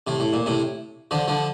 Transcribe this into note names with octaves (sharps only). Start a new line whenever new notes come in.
A2 C3
A2
A#2
A2 C3
D3 F3
D3 F3